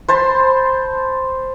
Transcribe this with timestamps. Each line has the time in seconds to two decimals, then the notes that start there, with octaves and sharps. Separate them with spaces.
0.08 C5 A5 B5 C6